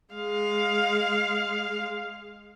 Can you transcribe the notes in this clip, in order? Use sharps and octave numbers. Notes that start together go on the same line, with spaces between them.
G#3 F5